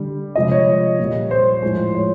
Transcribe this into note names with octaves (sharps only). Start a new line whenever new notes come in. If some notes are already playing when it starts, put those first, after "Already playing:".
Already playing: D3 G3
C3 F3 G#3 D#5
C#5
A#2 G3
C5
A2 F3 G#3
C#5